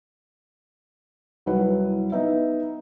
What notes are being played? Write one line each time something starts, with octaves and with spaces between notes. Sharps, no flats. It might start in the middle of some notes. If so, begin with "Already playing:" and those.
C2 F#3 E4 B4 F#5
B3 D#4 B4 E5